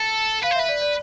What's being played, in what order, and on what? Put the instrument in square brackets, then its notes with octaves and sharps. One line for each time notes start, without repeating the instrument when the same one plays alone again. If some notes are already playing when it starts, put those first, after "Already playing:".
Already playing: [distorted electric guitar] A4 [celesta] A5
[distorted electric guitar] B4 [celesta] F5
[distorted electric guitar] C5
[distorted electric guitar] B4 [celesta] E5
[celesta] D5
D5